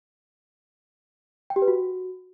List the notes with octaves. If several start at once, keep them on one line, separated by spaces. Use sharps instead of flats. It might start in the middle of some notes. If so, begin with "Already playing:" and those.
G5
G4
B4
F#4